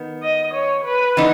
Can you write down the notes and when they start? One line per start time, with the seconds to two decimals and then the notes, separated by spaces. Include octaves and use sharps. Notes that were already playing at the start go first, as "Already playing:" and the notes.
Already playing: D#3 B3
0.23 D#5
0.54 C#5
0.85 B4
1.17 E3 B3 D#4